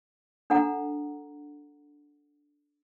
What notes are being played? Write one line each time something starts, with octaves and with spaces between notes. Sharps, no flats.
D4 A4 F#5 A#5